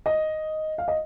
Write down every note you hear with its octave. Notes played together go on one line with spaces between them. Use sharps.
D#5
F5
D#5